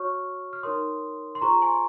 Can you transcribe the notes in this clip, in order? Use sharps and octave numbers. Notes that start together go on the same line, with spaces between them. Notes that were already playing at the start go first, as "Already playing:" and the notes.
Already playing: F#4 C#5 C#6 F6
F6
D#4 A#4 C#5 C6 D#6
C6
F4 G#4 C5 A#5 C#6
G#5 C6